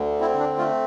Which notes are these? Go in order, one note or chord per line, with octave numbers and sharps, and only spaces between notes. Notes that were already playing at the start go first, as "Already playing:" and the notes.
Already playing: D2 D3
C4 E4
D4
A3 F4